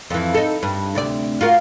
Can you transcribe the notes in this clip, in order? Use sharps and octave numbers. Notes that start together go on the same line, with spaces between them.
F2 E3
D#4 A4
G2
D2 C3 D5
F4 F#4 A#4